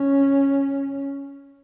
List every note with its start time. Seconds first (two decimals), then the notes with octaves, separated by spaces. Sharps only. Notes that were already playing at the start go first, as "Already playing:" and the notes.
Already playing: C#4